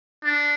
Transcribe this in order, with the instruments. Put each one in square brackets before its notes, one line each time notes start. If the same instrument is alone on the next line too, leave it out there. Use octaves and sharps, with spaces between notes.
[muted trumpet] D4